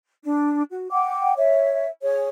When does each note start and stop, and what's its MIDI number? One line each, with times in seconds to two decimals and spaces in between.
0.23 0.62 62
0.70 0.89 66
0.91 1.33 78
0.91 1.33 79
0.91 1.33 86
1.37 1.87 73
1.37 1.87 76
2.02 2.29 68
2.02 2.29 73